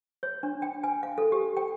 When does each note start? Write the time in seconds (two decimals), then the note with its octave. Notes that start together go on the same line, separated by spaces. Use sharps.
0.23 C#5
0.43 D4
0.62 G5
0.84 G#5
1.03 F5
1.18 A4
1.32 G4
1.57 G5